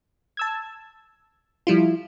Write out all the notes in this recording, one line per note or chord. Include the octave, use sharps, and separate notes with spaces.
A5 E6 G#6
F3 G3 E4 F4